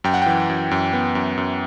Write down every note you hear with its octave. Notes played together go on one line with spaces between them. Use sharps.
F#2 G5
F#5
E3 G5
F#2
F#2
B3
F#2
F#2